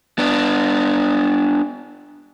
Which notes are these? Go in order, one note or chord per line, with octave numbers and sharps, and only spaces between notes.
B3 D4